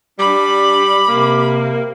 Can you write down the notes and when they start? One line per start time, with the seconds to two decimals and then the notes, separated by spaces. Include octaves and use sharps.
0.19 G3 D4 B5 D6
1.08 C3 A#3